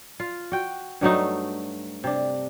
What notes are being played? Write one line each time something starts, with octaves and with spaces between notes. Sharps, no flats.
F4
F#4 G5
G2 F#3 A3 D#4
C3 D4